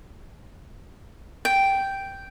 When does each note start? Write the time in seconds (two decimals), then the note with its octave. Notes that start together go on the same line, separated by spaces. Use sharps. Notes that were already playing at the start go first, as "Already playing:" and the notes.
1.45 G5